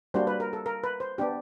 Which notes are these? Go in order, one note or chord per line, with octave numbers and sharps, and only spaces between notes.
G3 A#3 D4 F#4 C5
B4
A#4
A4
A#4
B4
C5
B3 D4 G4